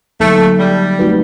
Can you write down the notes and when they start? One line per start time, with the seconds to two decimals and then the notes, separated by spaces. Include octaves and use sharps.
0.20 D3 F#3 A3 A#3 D#4
0.59 G3
0.99 A3 C4 D#4 F#4 B4